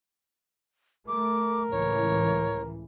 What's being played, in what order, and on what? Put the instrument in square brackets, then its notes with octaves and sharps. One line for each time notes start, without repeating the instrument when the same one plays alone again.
[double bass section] A3 [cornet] A#4 [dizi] D6
[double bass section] C#2 A2 E3 [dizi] C#5